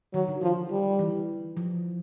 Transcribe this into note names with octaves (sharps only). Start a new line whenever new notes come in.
D#3 F#3
D3
D#3 F3
G3
E3
F3